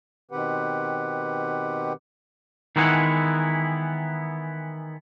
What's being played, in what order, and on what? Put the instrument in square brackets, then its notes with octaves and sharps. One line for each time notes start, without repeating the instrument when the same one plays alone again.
[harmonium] B2 D#3 C4 G4 B4 F#5
[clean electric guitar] D#3 E3 G#3 B3 E4 F#5